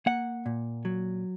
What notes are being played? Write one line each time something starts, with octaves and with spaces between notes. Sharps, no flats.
A#3 F#5
A#2
F#3